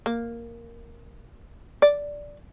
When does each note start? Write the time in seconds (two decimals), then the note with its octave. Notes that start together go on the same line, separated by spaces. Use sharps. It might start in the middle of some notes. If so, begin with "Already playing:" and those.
0.06 A#3
1.82 D5